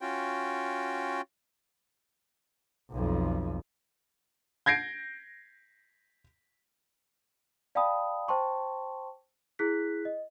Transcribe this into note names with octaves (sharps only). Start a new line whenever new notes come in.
C#4 F4 F#4 G5
B1 F2
G6 G#6 A#6 C7 D7
D5 F5 G5 A5 B5 D#6
C5 G5 A5 C6 C#6
E4 G#4 F#6 B6
D#5